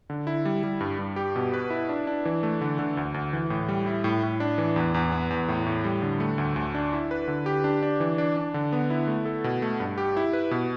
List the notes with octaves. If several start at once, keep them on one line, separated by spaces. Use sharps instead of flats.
D3
E4
G3
G3
G2
G2
G4
B2
B4
E4
D4
D4
E3
A3
D3
D3
D2
D2
E3
A2
G3
E4
A2
A2
D4
E3
E2
E2
B3
E2
A2
A2
G3
D3
A3
D2
D2
D4
E4
B4
D3
G4
D4
D4
E3
D4
D4
D3
B3
E4
A3
A4
B2
A3
G2
G4
E4
B4
B2